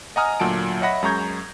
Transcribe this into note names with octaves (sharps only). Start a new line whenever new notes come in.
D#5 F#5 G#5 A#5 D#6 F6
D2 A#2 F#3 A5 D7
C#5 D#5 E5 F#5 B5 A#6
F#2 G#3 A#5 C#6 G6 G#6